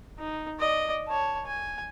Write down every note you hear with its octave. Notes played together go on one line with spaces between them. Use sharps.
D#4
D5 D#5
C#5 A5
G#5